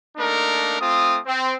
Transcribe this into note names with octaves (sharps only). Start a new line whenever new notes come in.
A3 A#3 D4 D#4 A#4
A3 C4 F4 D#6
C4